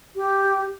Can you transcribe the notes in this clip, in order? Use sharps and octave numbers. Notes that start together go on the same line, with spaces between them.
G4